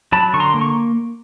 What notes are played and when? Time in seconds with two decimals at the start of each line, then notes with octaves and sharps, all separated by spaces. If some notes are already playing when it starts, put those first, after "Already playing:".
0.12 F#3 A5 B5
0.34 D3 C#6
0.40 A#5 C6
0.54 A#3
0.61 C#6